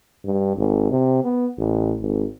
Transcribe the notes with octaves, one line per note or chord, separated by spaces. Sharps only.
G2
G#1
C3
B3
A1
G#1